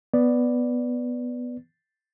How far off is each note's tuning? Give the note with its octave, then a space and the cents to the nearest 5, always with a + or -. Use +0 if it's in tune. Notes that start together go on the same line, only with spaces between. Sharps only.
B3 +0 B4 +0 D5 +0